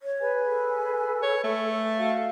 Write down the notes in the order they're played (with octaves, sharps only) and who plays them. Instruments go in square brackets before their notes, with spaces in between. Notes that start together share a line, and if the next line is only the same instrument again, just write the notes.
[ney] C#5
[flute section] G#4 B4 G#5
[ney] A4
[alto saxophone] C#5
A3
[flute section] F#4 [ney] F5